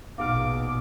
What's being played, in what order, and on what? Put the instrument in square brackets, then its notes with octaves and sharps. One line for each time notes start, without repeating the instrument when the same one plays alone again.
[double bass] A#1 B2 [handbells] B3 D#4 G#4 [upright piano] F5 F6 [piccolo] D6